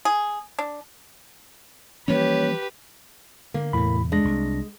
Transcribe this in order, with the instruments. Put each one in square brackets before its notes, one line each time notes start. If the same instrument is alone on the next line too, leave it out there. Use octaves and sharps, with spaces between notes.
[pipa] G#4
D4
[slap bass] E3 F3 G3 [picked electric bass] A#3 C#4 [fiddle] G4 B4 [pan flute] C#5
[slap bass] D3 [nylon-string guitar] A#3
[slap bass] E2 C3 [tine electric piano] A2 B5
[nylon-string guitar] G#3 [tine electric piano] D4 A#6
[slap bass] C2